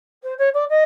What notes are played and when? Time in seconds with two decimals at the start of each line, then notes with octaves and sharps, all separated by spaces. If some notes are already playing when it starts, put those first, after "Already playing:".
0.23 C5
0.38 C#5
0.53 D5
0.69 D#5